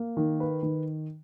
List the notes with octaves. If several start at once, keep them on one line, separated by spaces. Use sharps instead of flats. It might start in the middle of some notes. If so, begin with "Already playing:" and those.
Already playing: A#3
D#3
B4
D#3